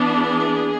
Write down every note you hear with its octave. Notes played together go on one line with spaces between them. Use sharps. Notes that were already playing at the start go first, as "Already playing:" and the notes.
Already playing: E3 B3 D4
G#4